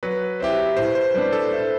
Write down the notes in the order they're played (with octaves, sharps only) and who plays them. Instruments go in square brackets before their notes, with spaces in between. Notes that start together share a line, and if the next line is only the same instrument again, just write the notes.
[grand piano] F#3 [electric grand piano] B4
[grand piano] C4 E4 G4 [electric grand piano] C5
[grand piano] A2 [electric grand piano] C5
[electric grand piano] C5
[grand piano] G3 D4 [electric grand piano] B4
[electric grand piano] A4
[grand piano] A3